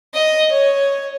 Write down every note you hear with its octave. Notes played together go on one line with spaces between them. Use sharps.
D#5
C#5